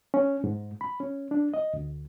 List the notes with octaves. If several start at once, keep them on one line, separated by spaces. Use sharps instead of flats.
C#4
G#2
B5
C#4
D4
D#5
D2